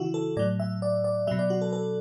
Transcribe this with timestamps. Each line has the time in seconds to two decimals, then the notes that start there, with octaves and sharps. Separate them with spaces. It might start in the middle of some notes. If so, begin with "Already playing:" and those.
Already playing: C#3 E3 E4 F#4
0.14 A4
0.37 A2 F#3 D5
0.60 E5
0.82 D5
1.04 D5
1.27 B2 F#3 E5
1.39 D5
1.50 F#4
1.62 A4
1.73 A4